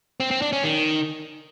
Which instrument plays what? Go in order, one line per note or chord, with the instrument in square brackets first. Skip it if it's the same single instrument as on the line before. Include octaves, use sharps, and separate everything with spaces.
[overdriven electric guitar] C4
C4
D4
C#4
D#3